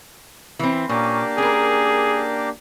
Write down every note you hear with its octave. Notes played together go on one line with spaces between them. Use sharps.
E3 C4
A#2 A#3 C#4 D4 G4
C#4 G#4 A#4